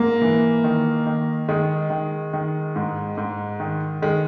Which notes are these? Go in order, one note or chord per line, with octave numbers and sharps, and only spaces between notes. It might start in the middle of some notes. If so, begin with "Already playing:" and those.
Already playing: G#2 A#3
E3
D#3
D#3
D#3 G#3
D#3
D#3
G#2
G#2
D#3
D#3 G#3